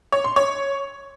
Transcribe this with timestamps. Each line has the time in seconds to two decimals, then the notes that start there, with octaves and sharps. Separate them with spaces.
0.12 C#5
0.24 C6
0.36 C#5